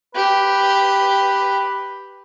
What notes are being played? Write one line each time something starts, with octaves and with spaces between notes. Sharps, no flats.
G4 B4